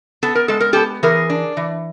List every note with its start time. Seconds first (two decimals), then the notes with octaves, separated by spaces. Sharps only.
0.23 B3 A4
0.35 A#4
0.48 G#3 A4
0.60 A#4
0.73 B3 G4 A4
1.03 E3 G#4 A#4
1.30 D4
1.57 E3